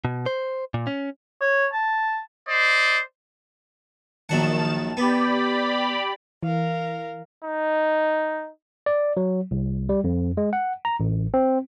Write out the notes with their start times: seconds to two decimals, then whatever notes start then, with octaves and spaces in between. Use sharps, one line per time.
0.05 B2
0.26 C5
0.74 A#2
0.87 C#4
1.41 C#5
1.73 A5
2.48 C5 D5 D#5
4.29 A#1 D#3 F#3 F#5 A5 E7
4.97 B3 G4 D5 B5
6.43 E3 A#4 F5
7.45 D#4
8.86 D5
9.17 F#3
9.51 C2
9.89 G3
10.04 F2
10.37 G#3
10.53 F#5
10.85 A#5
11.00 A1
11.34 C4